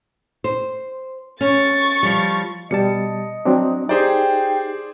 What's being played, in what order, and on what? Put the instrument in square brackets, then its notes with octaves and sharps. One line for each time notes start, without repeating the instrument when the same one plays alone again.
[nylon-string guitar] C5
[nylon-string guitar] C#4 [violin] C#6 A6
[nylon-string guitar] F3 G3
[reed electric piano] B2 G3 A5 [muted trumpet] D#5 [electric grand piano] C#7
[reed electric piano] F#3 C4 D4
[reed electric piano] D#4 G4 [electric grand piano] G#4 C5 D5 [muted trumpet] G5